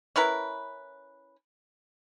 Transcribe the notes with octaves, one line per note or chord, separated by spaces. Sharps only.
C#4 E4 A#4 B4